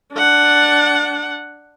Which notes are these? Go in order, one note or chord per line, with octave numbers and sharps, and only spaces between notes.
D4 F#5